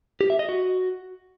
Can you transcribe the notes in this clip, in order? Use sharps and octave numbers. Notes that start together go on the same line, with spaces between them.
G4
E5
D#5
F#4